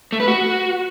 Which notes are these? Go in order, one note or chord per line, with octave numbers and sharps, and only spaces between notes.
A3
B4
F#4